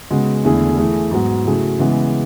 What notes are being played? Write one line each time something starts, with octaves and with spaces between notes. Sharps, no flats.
C#3 G#3 B3 F#4
E2 D3 A3 E4 G#4
E3 A3 E4 G#4
G#2 F#3 B3
C#3 F#3 A3 E4 G#4
C#3 E3 G#3 B3